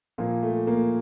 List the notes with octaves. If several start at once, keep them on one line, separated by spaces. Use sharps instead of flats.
A#2 F3 A#3
A3
A#3